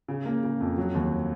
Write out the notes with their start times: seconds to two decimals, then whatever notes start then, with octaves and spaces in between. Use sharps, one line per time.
0.08 C#3
0.26 A#3
0.43 C#3
0.60 F2
0.78 F#3
0.95 D#2